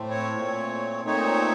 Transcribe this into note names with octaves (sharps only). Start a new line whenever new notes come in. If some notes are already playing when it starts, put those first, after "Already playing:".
Already playing: A2 A3 C4
C#5
A#2 A3 C4
A#2 A3 C4 D#4 C#5